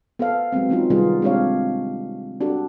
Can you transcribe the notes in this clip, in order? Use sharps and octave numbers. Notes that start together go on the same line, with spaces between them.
B3 A4 C5 F5
F#3 G#3 B3 C4
F3 B3 C#4 D#4 F4
C3 D#3 G3 B3 F4 G#4
G#3 C4 D4 G4 C#5 F5
D4 F#4 G4 A4